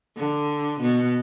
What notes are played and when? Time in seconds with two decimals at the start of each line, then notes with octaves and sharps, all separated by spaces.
0.17 D3
0.81 B2